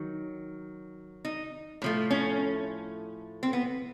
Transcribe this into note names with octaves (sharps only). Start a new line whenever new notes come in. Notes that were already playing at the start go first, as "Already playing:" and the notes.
Already playing: D#3 F#3
D#4
A2 F3 A3
C#4
C4
B3